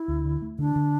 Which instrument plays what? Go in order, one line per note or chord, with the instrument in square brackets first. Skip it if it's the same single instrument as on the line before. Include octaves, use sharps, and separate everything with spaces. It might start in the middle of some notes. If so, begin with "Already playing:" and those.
Already playing: [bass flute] E4
[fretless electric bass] D2
D3
A3
[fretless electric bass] D3 [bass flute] D4
[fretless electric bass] D3